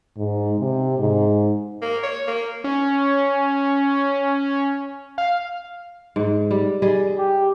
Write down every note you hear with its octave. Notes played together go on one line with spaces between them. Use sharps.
G#2
C3
G#2
A#3
C#5
A#3
C#4
F5
G#2
G3
G3 G#4 D#5
G4